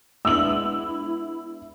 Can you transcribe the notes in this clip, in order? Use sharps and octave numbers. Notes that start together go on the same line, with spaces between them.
G#3 B3 D4 E4 E5 E6 F#7